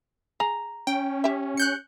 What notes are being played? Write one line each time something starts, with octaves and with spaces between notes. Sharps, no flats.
G#4 A#5
C#4 G5
G4 E5
F#6 G6 C#7